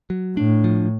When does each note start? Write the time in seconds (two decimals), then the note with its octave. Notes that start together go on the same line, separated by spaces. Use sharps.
0.10 F#3
0.37 A2 D4
0.64 F3